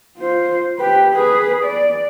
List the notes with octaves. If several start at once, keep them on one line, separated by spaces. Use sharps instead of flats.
F4 C5
G4 B4
G#4 B4
D5